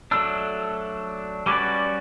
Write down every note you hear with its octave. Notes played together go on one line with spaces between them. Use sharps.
F#3 A3 D4 E6
G3 C#4 F#4 B4 D5 D6